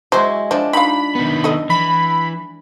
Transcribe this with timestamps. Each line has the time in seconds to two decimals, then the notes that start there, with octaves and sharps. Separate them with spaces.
0.12 F#3 G#3 E4 C5
0.51 F3 D4 D#5
0.73 D#4 F4 F5 B5
1.15 D#3 B3
1.44 A4 D#5
1.70 E3 B5